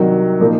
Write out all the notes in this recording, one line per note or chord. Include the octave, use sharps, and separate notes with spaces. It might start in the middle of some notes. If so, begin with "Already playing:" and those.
Already playing: C2 C3 D#3 F#3
A#2 F3 A#3 D#4